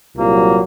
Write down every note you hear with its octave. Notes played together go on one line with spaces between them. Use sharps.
C2 A#2 F#3 A#3